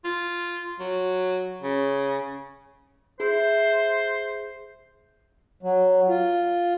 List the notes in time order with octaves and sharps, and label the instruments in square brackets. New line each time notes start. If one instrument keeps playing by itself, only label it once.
[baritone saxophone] F4
F#3
C#3
[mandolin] E4 [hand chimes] G#4 [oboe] C5
[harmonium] F#3
F4